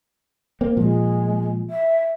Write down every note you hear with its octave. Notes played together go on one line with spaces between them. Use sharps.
A#3 C4
A#2 F3 G#3
E5